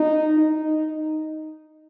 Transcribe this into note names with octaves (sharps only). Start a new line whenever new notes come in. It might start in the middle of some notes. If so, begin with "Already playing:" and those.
Already playing: D#4
D#4